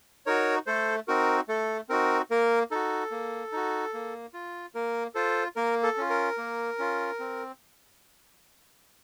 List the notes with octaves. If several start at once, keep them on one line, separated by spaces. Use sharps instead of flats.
D#4 F#4 A#4 C#5
A3 A4 C5
C4 D#4 F#4 A#4
A3 A4
C4 D#4 F#4 A#4
A#3 A#4
D#4 F#4 A4
A#3
D#4 F#4
A#3
F4
A#3 A#4
F4 A4 C5
A#3 A#4
A4
C#4 F4
A#4
A#3
C#4 F4
C4